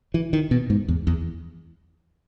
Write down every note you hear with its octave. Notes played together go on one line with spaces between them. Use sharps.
E3
D#3
B2
G#2
E2
E2